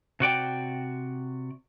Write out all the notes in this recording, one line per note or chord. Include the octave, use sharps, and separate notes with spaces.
C3 F#4 D5 G5